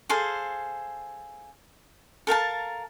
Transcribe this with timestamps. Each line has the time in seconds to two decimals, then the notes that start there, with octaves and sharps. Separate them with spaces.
0.09 G#4 A4 C5 F5
2.27 A4 A#4 F5 A5